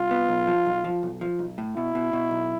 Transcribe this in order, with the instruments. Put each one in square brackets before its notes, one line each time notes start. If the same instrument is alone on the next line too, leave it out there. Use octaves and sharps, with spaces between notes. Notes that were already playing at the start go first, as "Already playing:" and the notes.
Already playing: [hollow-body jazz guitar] C2 [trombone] F4
[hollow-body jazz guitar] B3
B1
F3
B1
F3
B1
F3
B1
A2
[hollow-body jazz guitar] B2 [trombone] E4
[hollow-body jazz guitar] B2
B2
B1